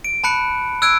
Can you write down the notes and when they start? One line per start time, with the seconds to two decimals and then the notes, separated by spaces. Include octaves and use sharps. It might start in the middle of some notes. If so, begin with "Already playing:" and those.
0.04 D7
0.24 A5 B5 F#6 C#7
0.82 E6 F#6 G#6 D7